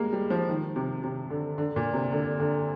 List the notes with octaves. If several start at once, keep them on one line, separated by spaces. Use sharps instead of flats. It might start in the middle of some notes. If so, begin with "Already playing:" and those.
Already playing: G3 G#3 A#3
G3
F3
D#3
C3
C3
D3
D3
A#2
C3
D3
D3